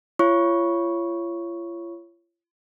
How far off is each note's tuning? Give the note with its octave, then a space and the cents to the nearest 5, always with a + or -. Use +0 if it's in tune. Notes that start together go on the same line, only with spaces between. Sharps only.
F4 -40 C#5 +0 C#6 +0